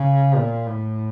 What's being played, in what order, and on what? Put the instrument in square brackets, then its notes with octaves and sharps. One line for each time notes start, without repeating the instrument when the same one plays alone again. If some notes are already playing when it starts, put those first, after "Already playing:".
Already playing: [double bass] C#3
A#2
A2